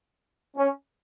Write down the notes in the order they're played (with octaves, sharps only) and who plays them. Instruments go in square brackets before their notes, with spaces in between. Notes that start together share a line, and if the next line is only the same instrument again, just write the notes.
[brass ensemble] C#4